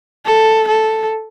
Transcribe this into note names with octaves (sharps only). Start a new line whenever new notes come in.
A4
A4